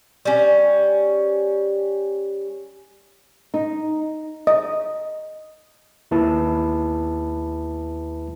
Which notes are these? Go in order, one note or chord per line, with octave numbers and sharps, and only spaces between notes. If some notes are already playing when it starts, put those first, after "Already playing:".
G3 C#4
D#4
D#5
D#2 E4 B4 A5